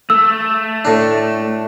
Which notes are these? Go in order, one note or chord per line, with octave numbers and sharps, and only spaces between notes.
A3 E6
A2 D4